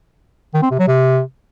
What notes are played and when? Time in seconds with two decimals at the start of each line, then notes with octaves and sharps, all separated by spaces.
0.54 D#3
0.62 C4
0.71 C3
0.79 F#3
0.87 C3